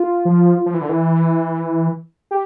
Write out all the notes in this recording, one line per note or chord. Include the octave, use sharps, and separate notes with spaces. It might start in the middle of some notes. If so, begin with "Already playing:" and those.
Already playing: F4
F3
F3
E3
D3
E3
G4